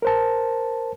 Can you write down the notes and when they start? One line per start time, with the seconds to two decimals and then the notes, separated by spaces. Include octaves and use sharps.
0.02 A#4 C5 A5